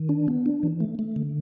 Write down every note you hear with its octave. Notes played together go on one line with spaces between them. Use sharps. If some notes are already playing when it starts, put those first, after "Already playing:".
Already playing: D#3
D4
B3
D4
E3
A3
A3
D3